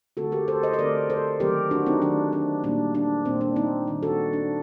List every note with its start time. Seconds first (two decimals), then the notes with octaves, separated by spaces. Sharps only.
0.17 D3 A3 C4 F#4 A4
0.32 G4 A#4
0.48 A4 C5
0.63 C5 D#5
0.74 D#5
0.78 D3 A3 C4 A#4 D5
1.10 A4 C5
1.40 D#3 F#3 A3 C4 G4 A#4
1.71 D4 F#4
1.86 C4 D#4
2.02 D#3 F#3 A3 C4 D4
2.33 D4
2.64 A#2 G3 A#3 D4
2.95 D4
3.25 A#2 G3 A#3 C4
3.41 D4
3.56 C4 D#4
3.87 D#3 G3 C4
4.03 F#4 A4
4.33 D4